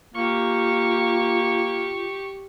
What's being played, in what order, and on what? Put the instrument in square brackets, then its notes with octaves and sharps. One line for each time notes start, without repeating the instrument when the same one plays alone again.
[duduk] A#3 [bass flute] F4 [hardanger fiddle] G4 C#6